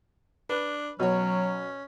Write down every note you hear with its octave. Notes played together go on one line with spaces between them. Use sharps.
D4 B4
B2 F#3 C#4 F#4 C#5